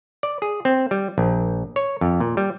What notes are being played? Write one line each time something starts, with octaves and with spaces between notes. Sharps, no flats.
D5
G#4
C4
G3
A#1
C#5
F2
A#2
G3